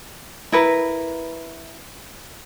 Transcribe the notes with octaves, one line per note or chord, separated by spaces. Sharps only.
E4 A#4 B4